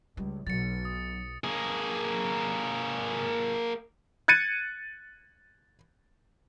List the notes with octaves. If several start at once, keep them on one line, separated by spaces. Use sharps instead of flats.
C#2 G3
B1 F#3 A6 C#7
D#6
A#3 G#4
F#6 G#6 A6 C#7 D#7